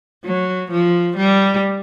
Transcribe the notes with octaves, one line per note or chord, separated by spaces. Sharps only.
F#3
F3
G3